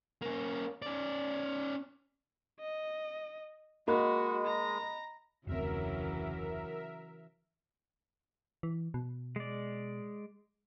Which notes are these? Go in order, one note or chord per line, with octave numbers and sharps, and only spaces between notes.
A#3 C#4
C#4 D5
D#5
G#3 A#3 F#4 D#5 B5 F#6
A#5
F1 D2 C#3 E3 F#3 C4 A#4 E5
E3
B2
G#3 D5